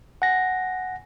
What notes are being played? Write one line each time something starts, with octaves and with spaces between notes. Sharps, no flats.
F#5 G#5 A#6